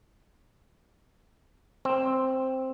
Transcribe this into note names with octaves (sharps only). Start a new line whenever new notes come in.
C4